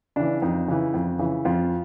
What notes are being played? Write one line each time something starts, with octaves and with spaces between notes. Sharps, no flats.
C#3 E3 D4
F2 D#4
C#3 E3
F2
C#3 E3
F2 F4